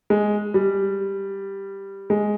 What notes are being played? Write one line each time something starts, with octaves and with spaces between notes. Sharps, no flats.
G#3
G3
G#3